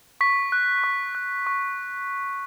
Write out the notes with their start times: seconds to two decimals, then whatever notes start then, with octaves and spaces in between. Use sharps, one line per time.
0.21 C#6 B6
0.52 F#6
0.84 C#6
1.15 F#6
1.47 C#6